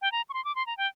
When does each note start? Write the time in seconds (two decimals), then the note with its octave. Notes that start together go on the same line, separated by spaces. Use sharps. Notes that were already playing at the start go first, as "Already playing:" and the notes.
0.02 G5
0.12 A#5
0.29 C#6
0.34 C6
0.45 D6
0.55 C6
0.67 A#5
0.77 G5